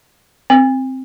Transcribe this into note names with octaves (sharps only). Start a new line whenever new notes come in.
C4